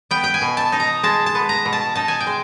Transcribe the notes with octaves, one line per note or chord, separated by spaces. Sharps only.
B3 G5
G5
G#5
B2
A5
D#4
A#5
G#3 A5
A5
B3
A#5
B2
A5
D#4 A5
G#5
G5
G#3